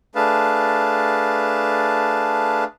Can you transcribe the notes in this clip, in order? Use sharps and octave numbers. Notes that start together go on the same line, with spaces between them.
A3 D4 G#4 B4 F5 A5